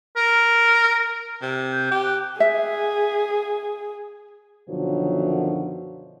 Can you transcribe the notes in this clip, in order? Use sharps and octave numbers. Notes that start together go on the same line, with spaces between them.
A#4
C3
G6
G4
F#6
G#4 E5
F#2 B2 D3 D#3 F3 F#3